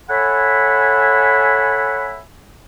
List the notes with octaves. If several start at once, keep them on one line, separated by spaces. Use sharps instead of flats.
A4 C#5 E5 F#5 G#5 B5